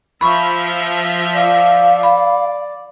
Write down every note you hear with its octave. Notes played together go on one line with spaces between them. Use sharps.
F3 E5 B5 C#6
D5 F5
B5